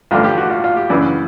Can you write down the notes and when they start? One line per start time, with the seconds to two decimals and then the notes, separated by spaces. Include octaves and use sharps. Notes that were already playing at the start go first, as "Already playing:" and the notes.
0.11 A1 G2 D3 F3 F4
0.24 G4
0.38 F#4
0.50 F4
0.64 F4
0.76 G4
0.90 F#2 C#3 E3 D4